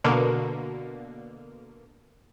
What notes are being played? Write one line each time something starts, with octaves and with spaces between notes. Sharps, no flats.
B2 D3 A#3